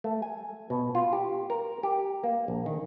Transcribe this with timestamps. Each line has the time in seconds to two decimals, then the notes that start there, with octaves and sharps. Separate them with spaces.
0.04 A3
0.22 G#5
0.70 B2
0.95 F4
1.13 G4
1.50 A#4
1.83 G4
2.24 A#3
2.48 A#1
2.66 D#3